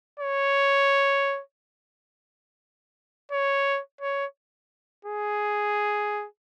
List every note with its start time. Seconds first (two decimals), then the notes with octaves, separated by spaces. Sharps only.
0.20 C#5
3.32 C#5
4.01 C#5
5.05 G#4